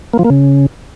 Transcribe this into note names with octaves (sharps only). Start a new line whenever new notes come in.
A#3
F3
A#3
C#3